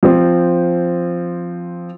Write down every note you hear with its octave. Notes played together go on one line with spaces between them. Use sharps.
F3 C4